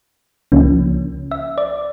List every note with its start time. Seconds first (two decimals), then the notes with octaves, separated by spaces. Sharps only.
0.52 C#2 C#3 F3 A#3 C#4
1.31 E5
1.58 D5